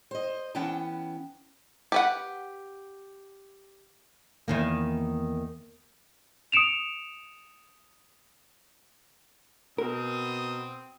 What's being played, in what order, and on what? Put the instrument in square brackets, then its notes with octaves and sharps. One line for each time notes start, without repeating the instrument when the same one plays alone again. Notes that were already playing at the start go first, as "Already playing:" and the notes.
[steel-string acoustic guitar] C5 D#5
E3 B3 C#4 F#5 G5 A5
[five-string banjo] G4 B4 F#5
[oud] E2 D#3 A#3
[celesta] D#6 C#7 D7 E7 F7
[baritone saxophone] B2 [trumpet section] C4 D#6 [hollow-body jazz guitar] A#4